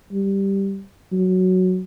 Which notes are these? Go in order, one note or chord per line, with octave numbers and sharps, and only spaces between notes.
G3
F#3